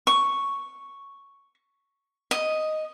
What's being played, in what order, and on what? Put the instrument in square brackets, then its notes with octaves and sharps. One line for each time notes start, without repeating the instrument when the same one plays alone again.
[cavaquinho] C#6
D#5